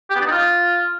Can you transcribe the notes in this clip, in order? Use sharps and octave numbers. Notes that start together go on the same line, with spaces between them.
G4
B3
D4
D#4
F4